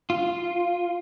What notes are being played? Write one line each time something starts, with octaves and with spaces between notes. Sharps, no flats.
F4